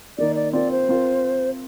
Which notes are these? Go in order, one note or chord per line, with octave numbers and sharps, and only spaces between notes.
D#3 A#3 D#4 D5
D5
C4 F4 A#4 D5
C5
C4 F4 A#4